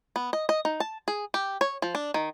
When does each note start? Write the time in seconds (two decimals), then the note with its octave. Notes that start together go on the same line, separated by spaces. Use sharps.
0.16 B3
0.33 D#5
0.49 D#5
0.65 D#4
0.80 A5
1.08 G#4
1.34 G4
1.61 C#5
1.82 F3
1.95 D4
2.14 D#3